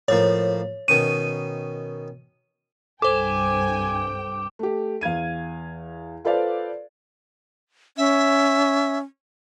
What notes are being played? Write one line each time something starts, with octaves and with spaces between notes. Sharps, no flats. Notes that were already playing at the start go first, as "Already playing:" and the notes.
A2 F3 A#3 C#5
B2 D#3 C#4 D#7
C2 G2 A4 C5 G5 G#5 D6 E7
A3 G4
E2 F5 G#6 D#7
F4 A4 B4 C5 D5 F5
C#4 E5